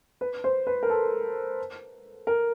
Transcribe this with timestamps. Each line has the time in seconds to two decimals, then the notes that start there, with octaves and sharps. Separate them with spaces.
0.21 B4
0.44 C5
0.67 B4
0.83 A#4
0.90 A4
2.27 A#4